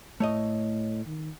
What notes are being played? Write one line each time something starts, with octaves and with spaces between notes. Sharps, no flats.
A2 A3 C#5 D#5
D#3